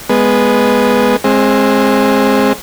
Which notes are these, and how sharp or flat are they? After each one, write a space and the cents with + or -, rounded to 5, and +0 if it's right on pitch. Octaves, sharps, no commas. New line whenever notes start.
G#3 +0 B3 +0
G#3 -5 C4 +25